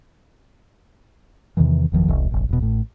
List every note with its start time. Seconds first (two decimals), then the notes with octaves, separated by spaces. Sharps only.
1.57 E2 C3 D#3 E3
1.92 F#1 E2 D#3 F3
2.08 E1 C2
2.31 F1 A#1
2.49 E1 B2
2.61 A1 A2